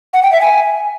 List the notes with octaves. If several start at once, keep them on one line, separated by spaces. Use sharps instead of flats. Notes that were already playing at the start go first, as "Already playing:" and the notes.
F#5
G5
E5
G#5